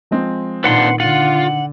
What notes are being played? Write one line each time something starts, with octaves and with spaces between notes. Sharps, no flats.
F3 G#3 C4
A#2 D#3 C4 D4 F4 B4 F#5 C6
D3 F4 F#5